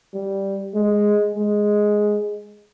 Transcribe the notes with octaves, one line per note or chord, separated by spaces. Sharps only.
G3
G#3
G#3